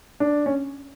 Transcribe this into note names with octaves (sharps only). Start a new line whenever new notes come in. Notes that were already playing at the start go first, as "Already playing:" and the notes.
D4
C#4